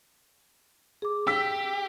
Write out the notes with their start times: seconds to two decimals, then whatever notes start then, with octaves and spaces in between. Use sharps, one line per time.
1.02 G#4 D6
1.27 G4 E6 B6